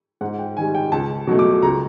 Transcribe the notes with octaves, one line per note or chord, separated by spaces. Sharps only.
G#2 F#5
G5
D#3 G3 G#5
G5
C#2 A5
B2 F#3 A3
D6
C#2 A#5